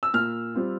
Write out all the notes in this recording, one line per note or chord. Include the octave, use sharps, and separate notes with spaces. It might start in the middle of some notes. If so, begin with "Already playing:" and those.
E6
A#2 F6
G3 C4 F4